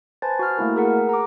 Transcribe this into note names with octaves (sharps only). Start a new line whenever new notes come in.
B4 C5 G#5 A5 A6
F#4 F6
A3 A#3 E4 A#4
G#4 A#4 F#5
A#5 D6